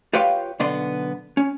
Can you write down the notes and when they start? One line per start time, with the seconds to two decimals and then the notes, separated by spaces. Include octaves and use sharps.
0.13 F4 G4 B4 C#5 F5 G5
0.60 B1 D3 B3 D5 C6
1.37 C#4